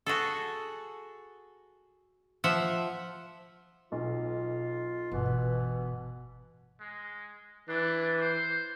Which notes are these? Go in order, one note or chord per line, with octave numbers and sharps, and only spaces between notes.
F#4 G#4 A4
F3 E5 F#5
B1 F4
G1 B2 E3
G#3
E3 D4
C5